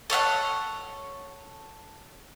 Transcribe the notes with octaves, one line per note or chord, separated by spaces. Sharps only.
A4 C#5 F5 F#5